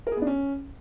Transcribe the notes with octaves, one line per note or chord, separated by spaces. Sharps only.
A#4
G#4
B3
D4
C#4